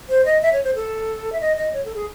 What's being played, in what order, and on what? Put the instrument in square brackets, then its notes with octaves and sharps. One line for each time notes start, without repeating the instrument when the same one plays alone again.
[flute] C5
D#5
E5
C#5
C5
A4
E5
D#5
D#5
C#5
A4
G#4